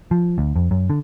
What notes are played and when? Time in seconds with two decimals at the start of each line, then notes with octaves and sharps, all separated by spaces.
0.11 F3
0.38 D2
0.56 F2
0.71 F#2
0.90 D3